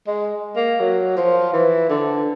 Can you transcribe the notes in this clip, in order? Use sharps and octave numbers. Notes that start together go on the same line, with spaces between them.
G#3
A#3
F#3
F3
E3
D3